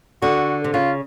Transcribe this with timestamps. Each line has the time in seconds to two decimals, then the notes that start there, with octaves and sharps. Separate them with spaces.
0.22 D3 F#4
0.64 C3
0.74 C#3 F4